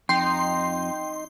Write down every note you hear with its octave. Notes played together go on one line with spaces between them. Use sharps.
F2 D#4 G5 C6